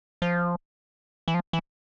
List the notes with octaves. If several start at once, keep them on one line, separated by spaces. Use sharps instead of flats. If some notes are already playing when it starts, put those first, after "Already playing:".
F3
E3
F3
E3